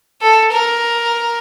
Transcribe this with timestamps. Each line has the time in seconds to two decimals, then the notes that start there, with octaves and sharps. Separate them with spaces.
0.21 A4
0.52 A#4